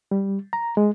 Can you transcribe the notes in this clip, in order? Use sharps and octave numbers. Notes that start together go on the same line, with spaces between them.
G3
A#5
G#3